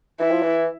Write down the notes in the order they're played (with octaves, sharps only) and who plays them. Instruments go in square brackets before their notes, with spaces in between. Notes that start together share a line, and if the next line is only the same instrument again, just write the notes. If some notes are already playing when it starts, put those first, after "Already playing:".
[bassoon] E3 [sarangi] E4
[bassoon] F3
E3